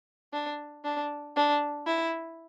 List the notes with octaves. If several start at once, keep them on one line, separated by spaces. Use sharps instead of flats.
D4
D4
D4
E4